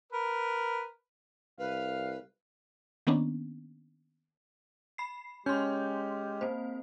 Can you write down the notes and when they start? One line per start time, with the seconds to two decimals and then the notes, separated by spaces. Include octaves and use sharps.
0.12 A#4 B4
1.59 C2 B4 F5
3.07 D#3 A#3 B3 C#4 D4
4.98 B5 C7
5.46 G#3 C#4 G4 C6 G6
6.41 A#3 C4 C5